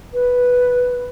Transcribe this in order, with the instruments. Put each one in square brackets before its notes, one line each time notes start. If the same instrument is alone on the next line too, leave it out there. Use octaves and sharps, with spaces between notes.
[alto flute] B4